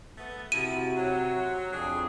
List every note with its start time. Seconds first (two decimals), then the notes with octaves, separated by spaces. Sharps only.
0.18 A3 B3
0.52 C3 F3 E4 F#4 D#7
0.97 F#3
1.73 F2 D4 G#4